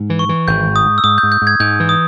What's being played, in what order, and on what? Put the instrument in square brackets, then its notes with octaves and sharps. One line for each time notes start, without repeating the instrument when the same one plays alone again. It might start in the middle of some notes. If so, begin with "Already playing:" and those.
Already playing: [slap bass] G#2
E3
[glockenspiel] C#6
[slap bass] E3
[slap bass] G#1 [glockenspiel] G6
[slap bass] G#2
[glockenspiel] D#6
[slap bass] G#2
[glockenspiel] E6
[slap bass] G#2 [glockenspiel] D#6
[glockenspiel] G6
[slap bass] G#2
[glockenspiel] G6
[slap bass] G#2
[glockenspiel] G#6
[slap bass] G#2 [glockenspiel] G6
[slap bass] E3
[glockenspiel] D#6